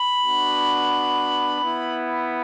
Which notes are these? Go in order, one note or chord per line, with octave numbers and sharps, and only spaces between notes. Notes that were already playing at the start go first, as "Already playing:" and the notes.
Already playing: B5
B3 D4 F#4
B3 E4